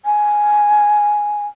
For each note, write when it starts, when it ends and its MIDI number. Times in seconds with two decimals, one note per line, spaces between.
0.05 1.47 80